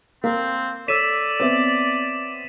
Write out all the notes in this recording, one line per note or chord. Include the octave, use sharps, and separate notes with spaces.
A#3 C4 F5
A4 C#5 D5 E6 B6 D#7 E7
B3 C4 C#5 E5